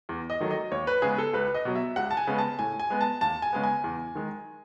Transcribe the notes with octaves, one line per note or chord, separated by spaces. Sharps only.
E2
D#5
D#3 F#3 A3
D#5
D#2 C#5
B4
C#3 G#3 B3 G#4
A4
C#2 B4
D#5
B2 F#3
E5
C#2 F#5
A5
G#5
C#3 G#3 B3
A5
A2 G#5
G#5
G#3 B3
A5
D#2 A5
G#5
C#3 G#3 B3
G#5
E2
D#3 G#3